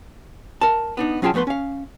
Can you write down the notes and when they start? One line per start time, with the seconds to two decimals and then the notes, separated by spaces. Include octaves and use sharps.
0.61 A#4 A5
0.97 B3 D4 D#4
1.22 F#3 C#4 F4 G#4 G5 A5
1.34 F3 A3 B3 B4 C6
1.47 C#4 F5